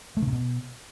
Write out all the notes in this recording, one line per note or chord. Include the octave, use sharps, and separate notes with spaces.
A3
C#3
C3
B2